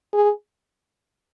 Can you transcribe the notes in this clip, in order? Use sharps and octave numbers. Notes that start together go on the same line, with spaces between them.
G#4